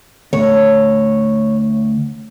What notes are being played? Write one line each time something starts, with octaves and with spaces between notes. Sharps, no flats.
D2 C#5